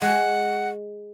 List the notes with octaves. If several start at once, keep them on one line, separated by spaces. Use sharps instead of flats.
G#3 F#5